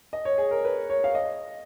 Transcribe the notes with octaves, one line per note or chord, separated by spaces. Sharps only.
D#5
C#5
G#4
A#4
B4
C#5
F5
D#5